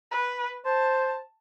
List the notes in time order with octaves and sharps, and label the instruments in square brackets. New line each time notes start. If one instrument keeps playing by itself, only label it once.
[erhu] B4
[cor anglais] C5 [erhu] A5